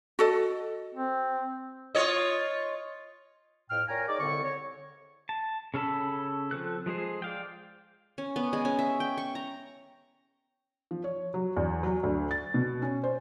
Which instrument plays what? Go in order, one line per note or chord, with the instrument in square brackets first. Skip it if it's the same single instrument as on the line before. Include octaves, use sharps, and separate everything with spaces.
[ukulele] F#4 A4 D#5
[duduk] C4
[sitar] F4 C#5 D#5
[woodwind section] F2 A2 G5 F6
A#2 C#5 G5 G#5 A#5
D#4 G#4 C#5 D5
C2 D3 C4 C#6
C#5
[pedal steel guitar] A5
C#3 C#4 A4 A5 B5
F3 C4 A4 F#6
F3 G#3 G#4 C5
D5 F5 G5
[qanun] C#4
B3
G#3
C#4
E5
G5
C#6
A#5
[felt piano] F3
C#5
F#3
E2
F#3
D2
A6
B2
C#4
C5